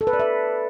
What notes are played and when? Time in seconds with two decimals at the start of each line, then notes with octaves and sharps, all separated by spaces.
0.01 A4
0.07 B4
0.13 D5
0.19 E5